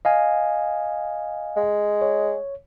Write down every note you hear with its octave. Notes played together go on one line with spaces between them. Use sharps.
D#5 F5 G#5
G#3
C#5